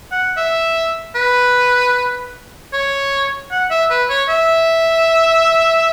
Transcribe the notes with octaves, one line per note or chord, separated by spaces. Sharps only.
F#5
E5
B4
C#5
F#5
E5
B4
C#5
E5